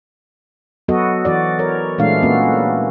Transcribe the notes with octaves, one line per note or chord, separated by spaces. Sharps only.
F#3 B3 F#4 A4 D#5
E3 F#4 D5
A#4 C#5
A#2 E3 G#3 A3 D4 F5
A#3 B3 C#4 F#4 A4